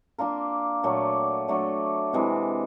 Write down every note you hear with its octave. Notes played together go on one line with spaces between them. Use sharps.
A#3 D4 F4 A#4
A#2 F#3 A3 D4
F#3 A3 D4
C3 E3 G#3